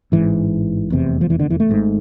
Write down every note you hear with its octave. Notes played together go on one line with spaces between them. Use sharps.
A1 G#2 E3
F1 E2 C3
F3
E3
D3
E3
A3
G#1 G#2